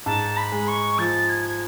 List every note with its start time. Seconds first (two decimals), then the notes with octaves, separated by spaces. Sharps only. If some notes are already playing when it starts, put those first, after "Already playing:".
0.05 G#2 A5
0.36 B5
0.52 G#3
0.68 C#6
0.98 F3 A6
1.29 G#6